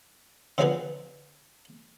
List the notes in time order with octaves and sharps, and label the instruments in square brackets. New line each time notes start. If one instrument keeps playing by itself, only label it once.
[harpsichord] D3 F3 F#3 D#4 G#4 B4